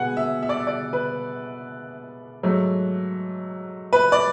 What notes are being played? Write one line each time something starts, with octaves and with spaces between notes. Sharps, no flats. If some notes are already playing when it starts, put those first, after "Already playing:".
Already playing: B2 G#3 B3 F#5 G#5
E5
E5
D5
E5
D5
B4
G#2 F#3 A3
B4
D5